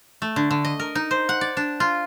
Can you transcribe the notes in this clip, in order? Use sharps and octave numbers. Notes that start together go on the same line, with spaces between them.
A3
D3
D3
D#5
A#4
D#4
C5
F#5
D5
D4
F4